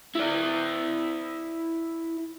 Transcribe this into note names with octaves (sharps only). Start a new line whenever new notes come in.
E4 D5